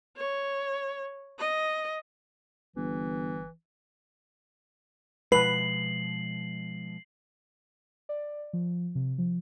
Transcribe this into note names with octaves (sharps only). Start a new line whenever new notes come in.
C#5
D#5
G1 E3
B2 F3 G#3 B4 C7 F#7
D5
F3
C3
F3